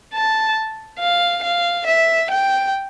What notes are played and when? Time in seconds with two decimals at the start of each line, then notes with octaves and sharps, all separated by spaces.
0.13 A5
1.00 F5
1.43 F5
1.87 E5
2.31 G5